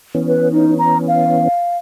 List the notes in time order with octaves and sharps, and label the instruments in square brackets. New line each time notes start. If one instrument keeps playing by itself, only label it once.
[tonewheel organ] E3 B3 C#4
[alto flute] B4
D#4
A#5
F5